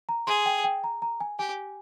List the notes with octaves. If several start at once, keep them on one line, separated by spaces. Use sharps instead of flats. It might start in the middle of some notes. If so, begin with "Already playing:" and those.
A#5
G#4 C6
G5
G5
A#5
A#5
G#5
G4 G#5